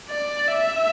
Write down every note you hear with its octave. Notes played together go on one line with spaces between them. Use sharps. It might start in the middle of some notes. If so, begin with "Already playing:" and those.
D5
E5